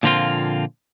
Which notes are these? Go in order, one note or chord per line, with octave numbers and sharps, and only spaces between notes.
A#2 D3 F3 A#3 C4 F4